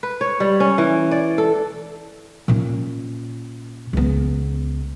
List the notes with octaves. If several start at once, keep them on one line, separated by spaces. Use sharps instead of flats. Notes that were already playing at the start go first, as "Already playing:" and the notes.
B4
C#5
G3
C#4
E3
D5
A4
A#2 C#4
C#2 B3